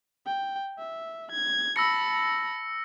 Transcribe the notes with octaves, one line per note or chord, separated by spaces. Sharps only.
G5
E5
G#6
A5 B5 E6 A#6 C#7